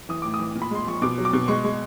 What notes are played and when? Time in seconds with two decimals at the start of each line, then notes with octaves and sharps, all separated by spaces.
0.09 E3 D#6
0.22 A2 D6
0.34 D#6
0.40 E3
0.55 A#2
0.62 B5
0.71 G#3 C6
0.86 F3 C#6
1.02 B2 D6
1.18 F#3
1.25 D6
1.33 B2
1.48 G#3 C#6
1.64 G#3